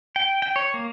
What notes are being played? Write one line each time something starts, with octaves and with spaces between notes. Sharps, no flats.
G5
G5
C#5
A#3